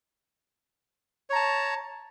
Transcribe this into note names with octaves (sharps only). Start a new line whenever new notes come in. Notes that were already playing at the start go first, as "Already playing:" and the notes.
C#5 A5 A#5